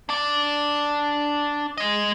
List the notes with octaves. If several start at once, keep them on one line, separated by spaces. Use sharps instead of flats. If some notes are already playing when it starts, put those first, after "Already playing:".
D4 D5
G#3 D#5